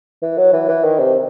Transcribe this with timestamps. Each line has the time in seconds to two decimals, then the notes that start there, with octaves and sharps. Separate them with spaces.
0.22 E3
0.38 F#3
0.53 E3
0.68 E3
0.84 D#3
0.99 C3